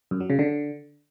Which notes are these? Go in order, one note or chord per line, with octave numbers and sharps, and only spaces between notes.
F#2
F#3
C#3
D3